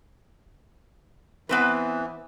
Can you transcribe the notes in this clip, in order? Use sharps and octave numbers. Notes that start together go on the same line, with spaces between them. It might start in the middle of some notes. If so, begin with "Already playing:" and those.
E3 B3 C4 B4